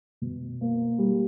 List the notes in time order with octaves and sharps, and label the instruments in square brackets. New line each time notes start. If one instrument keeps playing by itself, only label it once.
[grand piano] B2
A#3
G3